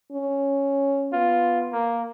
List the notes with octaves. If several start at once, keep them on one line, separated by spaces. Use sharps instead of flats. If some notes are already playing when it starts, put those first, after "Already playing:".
C#4
B3 F4
A#3